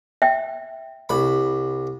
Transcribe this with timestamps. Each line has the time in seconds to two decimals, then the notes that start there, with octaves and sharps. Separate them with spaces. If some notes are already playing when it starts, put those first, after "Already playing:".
0.22 E5 G5
1.09 C2 B5